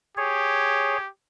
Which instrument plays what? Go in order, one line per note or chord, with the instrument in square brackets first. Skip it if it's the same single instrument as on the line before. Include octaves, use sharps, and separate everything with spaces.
[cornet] G4 [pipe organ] G#4 C#5